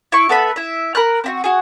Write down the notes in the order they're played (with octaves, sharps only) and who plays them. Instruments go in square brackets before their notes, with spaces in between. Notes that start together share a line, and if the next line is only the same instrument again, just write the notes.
[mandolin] E4 C#6
B3 A4 E5 B5
E4 E5
A#4 B5 F6 F#6
C4 E4 F#4
F#4 G#4